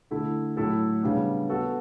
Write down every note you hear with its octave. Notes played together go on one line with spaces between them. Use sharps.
D3 A3 E4
A2 F#3 A3 E4 A4
C#3 G3 B3 D4
B3 F#4 A4